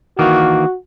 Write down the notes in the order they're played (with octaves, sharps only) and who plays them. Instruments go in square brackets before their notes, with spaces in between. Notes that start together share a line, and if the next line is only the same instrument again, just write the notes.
[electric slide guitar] D#3 E3 A#3 [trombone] F#4